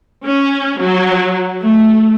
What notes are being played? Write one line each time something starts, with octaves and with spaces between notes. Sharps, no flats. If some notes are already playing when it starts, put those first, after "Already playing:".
C#4
F#3
A3